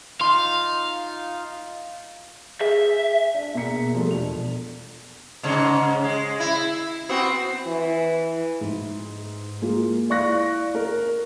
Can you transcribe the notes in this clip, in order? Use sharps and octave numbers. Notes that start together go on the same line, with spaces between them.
D#4 F4 F5 C6
G#4 E5
D4
B2 A#3 G#4 A#5 B6 C#7
F3 G3 A3
E1 D4 F7
G#2 C#3 C#4
G#3
E4
B3 C4 F#4
E3
G#2
G#3 A#3 F4
E4 D5 F5 C#6 F#6 A#6
A#4